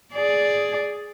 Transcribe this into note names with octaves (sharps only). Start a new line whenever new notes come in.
G#4 D5